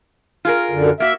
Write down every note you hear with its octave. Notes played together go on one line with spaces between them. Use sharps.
F4 G#4 A#4
F#2 D3
A#3 F#4 E5